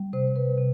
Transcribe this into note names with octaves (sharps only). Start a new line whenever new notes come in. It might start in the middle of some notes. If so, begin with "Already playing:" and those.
Already playing: G3
C3 C5
B4
C3